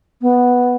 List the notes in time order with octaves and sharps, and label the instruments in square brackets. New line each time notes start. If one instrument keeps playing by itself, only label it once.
[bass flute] B3